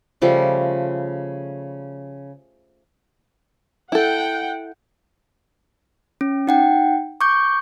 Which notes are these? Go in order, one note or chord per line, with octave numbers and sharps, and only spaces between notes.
C#3 F3 G3 A3
E4 A4 F#5 G5
C#4
D#4 F#5 G5
C#6 D6 G6